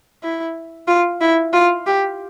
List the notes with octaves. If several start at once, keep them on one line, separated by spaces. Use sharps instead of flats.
E4
F4
E4
F4
G4